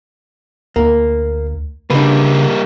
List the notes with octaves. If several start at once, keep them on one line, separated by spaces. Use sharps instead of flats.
D2 A#3
C#3 G3 A#3 D4 B4